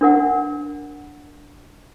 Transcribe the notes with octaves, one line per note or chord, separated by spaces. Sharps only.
D4 A#4 F#5